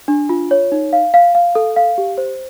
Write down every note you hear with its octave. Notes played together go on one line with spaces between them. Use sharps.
D4
F4
C#5
D#4
F5
F5
F5
A4
F5
G4
C5